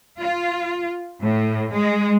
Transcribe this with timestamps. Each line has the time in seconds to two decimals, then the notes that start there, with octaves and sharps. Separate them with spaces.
0.18 F4
1.22 A2
1.73 G#3